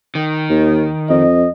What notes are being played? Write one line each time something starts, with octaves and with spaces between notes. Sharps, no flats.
D#3
D#2
F2 D#5